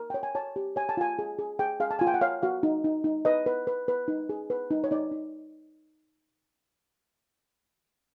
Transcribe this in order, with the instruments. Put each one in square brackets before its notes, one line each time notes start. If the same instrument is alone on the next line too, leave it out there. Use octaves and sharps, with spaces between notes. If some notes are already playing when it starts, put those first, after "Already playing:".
Already playing: [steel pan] A#4
C#5 G5
G#5
C#5 A5
G4
C#5 G#5
A5
F4 G#5
G#4
G#4
G#4 G5
G#4 F5
A5
F4 G#5
G5
F#5
C#5 F5
F#4 F5
D#4
D#4
D#4
B4 D#5
B4
B4
B4
D#4
G#4
B4
D#4
C#5
D#4 D5
D#4